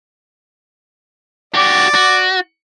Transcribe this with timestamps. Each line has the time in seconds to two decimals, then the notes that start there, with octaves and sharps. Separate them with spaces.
1.55 F#4 G4 D5
1.95 F#4